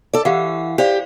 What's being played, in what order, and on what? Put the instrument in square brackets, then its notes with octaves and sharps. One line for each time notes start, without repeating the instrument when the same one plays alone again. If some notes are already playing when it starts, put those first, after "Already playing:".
[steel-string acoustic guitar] A4 D5
[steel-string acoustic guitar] E3 [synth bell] G4 F5 F#5
[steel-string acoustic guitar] G4 [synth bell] C5 D5 F5